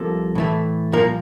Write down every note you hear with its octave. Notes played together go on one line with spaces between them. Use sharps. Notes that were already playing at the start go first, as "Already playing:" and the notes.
Already playing: C2 C3 F3 A#3 A4
A2 E3 A3
C2 A#2 F3 A#3 A#4